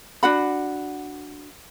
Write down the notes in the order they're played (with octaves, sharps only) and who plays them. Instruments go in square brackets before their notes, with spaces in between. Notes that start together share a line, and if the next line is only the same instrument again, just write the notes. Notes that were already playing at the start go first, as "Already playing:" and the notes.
[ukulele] D4 F#4 F#5 B5